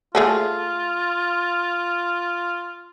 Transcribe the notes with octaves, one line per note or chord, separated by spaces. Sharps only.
A3 F4 G#4 A4